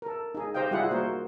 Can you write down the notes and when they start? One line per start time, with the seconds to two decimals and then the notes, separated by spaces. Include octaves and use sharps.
0.02 A4 A#4
0.35 D#4 G#4
0.54 G4 C5 D#5 F5 G5
0.71 G3 E4 F4 G#4 F#5
0.91 A#3 F#4 A#4 C5